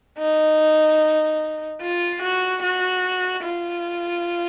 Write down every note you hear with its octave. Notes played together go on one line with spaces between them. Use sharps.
D#4
F4
F#4
F#4
F4